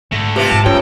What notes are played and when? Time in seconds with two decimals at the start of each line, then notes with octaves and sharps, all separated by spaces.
0.12 G#2 D3 A3 A#6
0.36 C3 F4 G4 B4 E5
0.51 G#2 A5
0.66 F#2 A3 F4 C#5 G5 A5